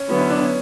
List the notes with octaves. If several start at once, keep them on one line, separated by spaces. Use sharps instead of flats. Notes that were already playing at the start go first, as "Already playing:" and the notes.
Already playing: C#4
D3 F#3 B3 E4
C#4
D4
C#4